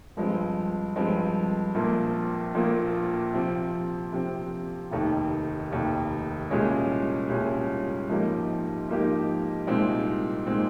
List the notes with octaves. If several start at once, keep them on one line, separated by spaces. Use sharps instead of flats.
G2 F3 G#3 C4
G2 F3 G#3 C4
A#1 A#2 F3 A#3
A#1 A#2 F3 A#3
C3 F3 C4
C3 F3 C4
F1 D#2 D#3
F1 D#2 D#3
C2 A#2 G#3 C#4 G#4
C2 A#2 G#3 C#4 G#4
G#2 F3 A#3 D#4 G4
G#2 F3 A#3 D#4 G4
C2 A#2 G#3 C4 D#4
A#2 G#3 C4 D#4